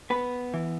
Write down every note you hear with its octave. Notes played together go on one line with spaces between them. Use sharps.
B3 B4
E3